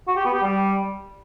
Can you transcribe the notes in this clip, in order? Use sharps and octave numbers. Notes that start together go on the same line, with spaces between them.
F#4
G4
B3
G4
G3